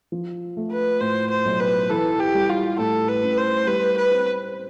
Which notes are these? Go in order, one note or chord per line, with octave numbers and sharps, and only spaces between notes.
F3
A3
B4
A2 C5
C5
B1
B4
E3 A4
G4
G3
F4
A2 A4
B4
A1
C5
G3 B4
B4
C4